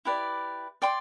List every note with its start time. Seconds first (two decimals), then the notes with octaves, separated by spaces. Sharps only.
0.05 E4 G4 B4 D5
0.82 D5 G5 C6